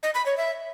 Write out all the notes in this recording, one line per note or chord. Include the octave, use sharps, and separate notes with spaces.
D#5
B5
C#5
E5